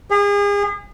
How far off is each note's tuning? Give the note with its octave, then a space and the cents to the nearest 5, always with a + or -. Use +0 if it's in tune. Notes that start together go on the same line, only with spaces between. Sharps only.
G#4 -35